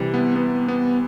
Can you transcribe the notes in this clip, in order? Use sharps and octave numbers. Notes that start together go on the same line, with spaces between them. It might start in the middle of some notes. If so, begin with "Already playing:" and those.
Already playing: C3 E3 G3
B3
B3
B3